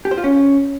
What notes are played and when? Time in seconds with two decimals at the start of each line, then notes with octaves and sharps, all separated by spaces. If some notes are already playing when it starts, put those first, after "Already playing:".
0.05 G4
0.11 C5
0.18 F4
0.24 C#4